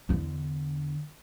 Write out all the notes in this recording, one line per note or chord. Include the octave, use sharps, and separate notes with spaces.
E2 D3